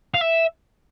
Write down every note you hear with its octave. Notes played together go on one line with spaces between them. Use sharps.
F5
E5